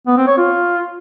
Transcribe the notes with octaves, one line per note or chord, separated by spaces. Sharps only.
B3
C4
C#5
F4